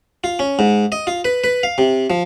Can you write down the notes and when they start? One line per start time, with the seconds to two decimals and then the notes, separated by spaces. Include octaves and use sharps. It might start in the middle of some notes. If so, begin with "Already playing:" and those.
0.24 F4
0.39 C#4
0.59 G#2
0.92 D#5
1.07 F4
1.25 B4
1.44 B4
1.63 F5
1.78 C3
2.10 F3